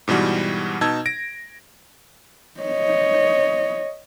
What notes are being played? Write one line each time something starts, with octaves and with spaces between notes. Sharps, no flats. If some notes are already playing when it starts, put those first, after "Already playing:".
G#2 B2 E3 G3 F#4
B2 D#4 A5 E6 G#6
A#6 D7
C#5 D#5